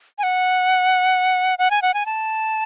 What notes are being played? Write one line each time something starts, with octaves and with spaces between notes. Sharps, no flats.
G#5
F#5
F#5
G#5
F#5
G#5
A5